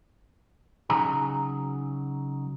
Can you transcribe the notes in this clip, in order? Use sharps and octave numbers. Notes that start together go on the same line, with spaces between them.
C#3 F#3 D#4 G#4 G#5 A#5